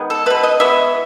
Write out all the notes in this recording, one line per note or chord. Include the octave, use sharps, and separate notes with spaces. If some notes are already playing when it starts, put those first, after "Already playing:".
Already playing: D#3 G#3 B3
A4
B2 A3 B4
D#5
E3 G#3 B3 E5